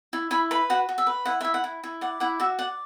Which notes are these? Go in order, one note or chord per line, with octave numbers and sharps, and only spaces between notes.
E4
E4 B5
B4 B5
F#4 F#5
F#4
E5
B4
E4 F#5
E4 E5
F#5
E4
E4
D5 F#5
E4 F#5
F#4 E5
D5 F#5